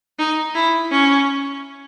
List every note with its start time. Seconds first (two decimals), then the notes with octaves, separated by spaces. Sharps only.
0.19 D#4
0.55 E4
0.91 C#4